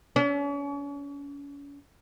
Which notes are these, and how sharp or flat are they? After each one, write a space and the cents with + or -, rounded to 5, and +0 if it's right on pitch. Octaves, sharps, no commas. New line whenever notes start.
C#4 +40